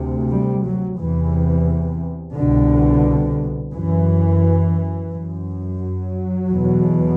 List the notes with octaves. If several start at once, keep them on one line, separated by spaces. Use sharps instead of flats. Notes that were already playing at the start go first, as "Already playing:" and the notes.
Already playing: D2 C3
G3
F#3
E2 C3 E3
C2 B2 D3
F#2 E3
F#2
F#3
E2 B2